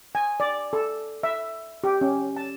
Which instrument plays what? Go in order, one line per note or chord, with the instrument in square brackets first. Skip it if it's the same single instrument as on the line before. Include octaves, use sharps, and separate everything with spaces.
[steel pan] G#5
D5
A4
E5
G4
C#4
A5